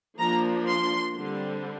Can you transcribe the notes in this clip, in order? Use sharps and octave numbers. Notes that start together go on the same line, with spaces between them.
F3 A#3 D4 A#5
C6
D3 G3 C4